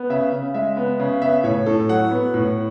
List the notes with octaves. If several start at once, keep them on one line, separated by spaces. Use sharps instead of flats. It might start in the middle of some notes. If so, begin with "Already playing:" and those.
Already playing: B3
C#3 E5
C#3
G#3 E5
B3
C#3
B3 E5
A2 C#5
A2 A4
F#3 F#5
B3
A2